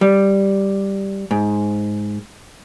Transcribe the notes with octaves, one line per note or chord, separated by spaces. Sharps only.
G3
G#2